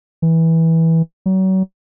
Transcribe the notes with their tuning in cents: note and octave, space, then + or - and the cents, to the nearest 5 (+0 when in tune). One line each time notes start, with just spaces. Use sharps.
E3 -15
F#3 +35